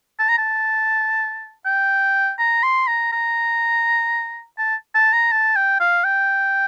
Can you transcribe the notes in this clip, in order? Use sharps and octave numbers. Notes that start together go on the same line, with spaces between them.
A5
A#5
A5
G5
A#5
C6
A#5
A#5
A5
A5
A#5
A5
G5
F5
G5